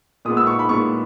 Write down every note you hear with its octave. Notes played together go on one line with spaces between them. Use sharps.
A#2 G#3 B3 D#6
E6
C#6
B5
A#2 G#3 B3 C#6